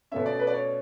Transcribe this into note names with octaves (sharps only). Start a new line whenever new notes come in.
B2 A3 C#4 E5
D5
B4
D5
C#5